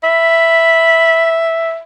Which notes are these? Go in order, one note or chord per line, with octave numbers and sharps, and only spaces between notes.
E5 B5